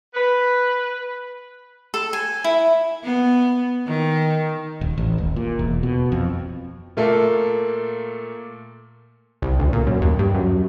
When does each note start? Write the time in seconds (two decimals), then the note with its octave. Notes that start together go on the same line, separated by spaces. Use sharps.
0.15 B4
1.94 A4
2.13 G#5
2.44 E4
3.04 B3
3.87 D#3
4.81 D#1
4.98 A1
5.18 D#1
5.36 A#2
5.59 E1
5.83 B2
6.12 F2
6.97 A#2 A3 A#3 A4
9.42 C2
9.59 D2
9.73 A#2
9.87 F#2
10.02 D#2
10.19 G2
10.35 F#2